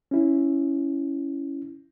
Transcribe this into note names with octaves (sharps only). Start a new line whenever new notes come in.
C#4 E4